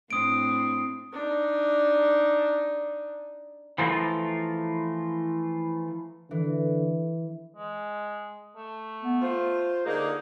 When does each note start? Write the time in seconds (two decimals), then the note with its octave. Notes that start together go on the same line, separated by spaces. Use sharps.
0.10 A2 C4 D4 D#6 D7
1.13 D4 D#4
3.78 E3 F3 A3 F4 A#4
6.31 D3 E3
7.56 G#3
8.56 A3
9.02 B3
9.22 F4 C5
9.86 D3 A#3 D#4 G#4